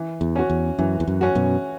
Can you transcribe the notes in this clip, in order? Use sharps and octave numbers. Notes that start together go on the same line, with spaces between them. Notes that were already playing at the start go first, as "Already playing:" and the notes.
Already playing: E3
E2
C#4 F#4
E2
F#2 E3
E2
F#2
C#4 F#4
F#2 B2